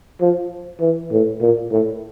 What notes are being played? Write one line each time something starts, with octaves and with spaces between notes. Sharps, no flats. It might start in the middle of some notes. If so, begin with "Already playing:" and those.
F3
E3
A2
A#2
A2